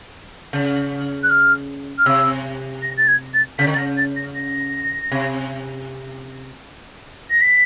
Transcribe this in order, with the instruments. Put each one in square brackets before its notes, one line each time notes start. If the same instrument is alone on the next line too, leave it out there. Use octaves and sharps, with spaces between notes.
[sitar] C#3
[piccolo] F#6
F6
F6
[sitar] C3 [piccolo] E6
[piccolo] A#6
A6
G#6
A6
[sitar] C#3 [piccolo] B6
[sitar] D3
[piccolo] A6
[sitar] C#3 [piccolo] A#6
[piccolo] A6
A#6
A#6
[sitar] C3
[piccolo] A#6
B6